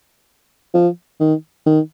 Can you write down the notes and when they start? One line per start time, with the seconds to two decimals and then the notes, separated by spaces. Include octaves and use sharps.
0.74 F3
1.20 D#3
1.66 D#3